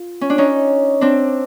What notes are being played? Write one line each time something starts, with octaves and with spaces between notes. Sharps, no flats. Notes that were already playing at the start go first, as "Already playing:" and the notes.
Already playing: F4
C#4
D4
C#4 D#4
C4 D4